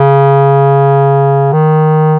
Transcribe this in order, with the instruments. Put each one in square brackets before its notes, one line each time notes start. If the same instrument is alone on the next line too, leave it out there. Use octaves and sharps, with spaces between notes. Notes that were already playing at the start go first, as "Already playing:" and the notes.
Already playing: [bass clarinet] C#3
D#3